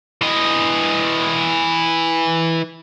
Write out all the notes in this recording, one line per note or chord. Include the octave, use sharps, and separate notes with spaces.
E3 D#5